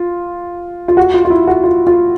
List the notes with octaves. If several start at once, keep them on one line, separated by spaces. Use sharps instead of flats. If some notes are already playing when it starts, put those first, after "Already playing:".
Already playing: F4
F4
F#4
F4
F4
E4
F#4
F4
F4